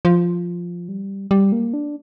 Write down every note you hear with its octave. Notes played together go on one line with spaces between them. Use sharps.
F3
G3
G3
A#3
D4